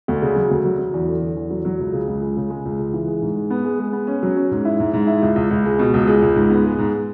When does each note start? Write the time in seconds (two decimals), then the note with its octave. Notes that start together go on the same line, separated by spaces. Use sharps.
0.08 D2
0.22 C#3
0.36 F#3
0.51 D2
0.65 F#3
0.79 F#3
0.94 E2
1.08 D3
1.22 D3
1.36 E2
1.50 F#3
1.65 F#3
1.79 C#2
1.93 C#3
2.07 C#2
2.22 G#3
2.37 C#3
2.50 G#3
2.65 C#2
2.79 C#3
2.94 E3
3.07 G#3
3.22 G#2
3.36 G#3
3.50 B3
3.64 G#3
3.79 G#3
3.93 B3
4.07 C#4
4.23 F#3
4.37 C#4
4.51 G#2
4.65 E4
4.80 G#2
4.93 G#2
5.07 E4
5.22 C#2
5.36 C#2
5.50 C#2
5.65 G#3
5.79 B2
5.94 C#2
6.07 G#3
6.22 C#2
6.36 G#2
6.50 B3
6.65 G#3
6.78 G#2